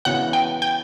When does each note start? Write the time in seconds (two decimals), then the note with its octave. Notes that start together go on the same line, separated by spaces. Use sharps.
0.05 C#3 E3 B3 F#4 C#5 F#5
0.33 G5
0.62 G5